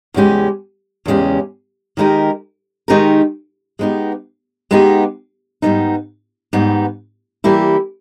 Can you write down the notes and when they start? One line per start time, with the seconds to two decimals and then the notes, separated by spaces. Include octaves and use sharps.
0.14 E2 C#3 G#3 C#4 G4
1.06 E2 C#3 G#3 C#4 G4
1.97 D#3 G#3 D#4 G4 A#4
2.88 D#3 G#3 D#4 G4 A#4
3.79 G#3 B3 D#4 G4
4.71 G#3 B3 D#4 G4
5.62 G#2 G3 B3 D#4
6.53 G#2 G3 B3 D#4
7.44 E3 G3 A#3 E4 G4